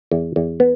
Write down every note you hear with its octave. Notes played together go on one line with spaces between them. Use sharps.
E2
E2
B3